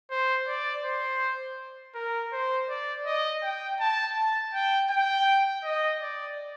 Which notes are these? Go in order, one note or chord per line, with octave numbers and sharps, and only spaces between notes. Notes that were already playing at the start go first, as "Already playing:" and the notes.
C5
D5
C5
A#4
C5
D5
D#5
G5
A5
A5
G5
G5
D#5
D5